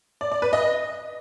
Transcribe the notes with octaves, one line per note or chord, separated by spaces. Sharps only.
D5
D5
B4
D#5